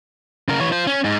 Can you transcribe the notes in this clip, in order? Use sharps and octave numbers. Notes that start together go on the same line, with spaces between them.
C#3 A#4
E3 C#5
F4 C5
C#4
G#2